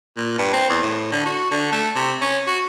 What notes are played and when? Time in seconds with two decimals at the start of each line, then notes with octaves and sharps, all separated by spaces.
0.17 A#2
0.38 G2
0.53 C4
0.69 E2
0.82 A2
1.12 D3
1.26 F#4
1.51 D3
1.72 A3
1.96 C3
2.21 C#4
2.47 F#4